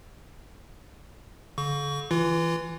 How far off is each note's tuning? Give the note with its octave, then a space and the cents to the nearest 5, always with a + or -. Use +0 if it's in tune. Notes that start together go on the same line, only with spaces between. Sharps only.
D3 -45 C#6 +30
E3 +0 F4 -35